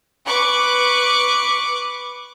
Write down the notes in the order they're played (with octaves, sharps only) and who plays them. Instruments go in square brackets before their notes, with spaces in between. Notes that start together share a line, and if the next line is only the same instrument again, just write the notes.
[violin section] B4 C#6 D6 F#6